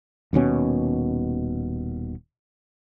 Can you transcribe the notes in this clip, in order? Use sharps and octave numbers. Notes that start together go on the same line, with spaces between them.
D#1 D#2 B2 C#4